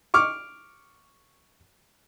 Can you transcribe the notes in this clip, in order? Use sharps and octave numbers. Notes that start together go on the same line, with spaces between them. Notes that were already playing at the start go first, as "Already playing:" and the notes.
C#6 D6 F6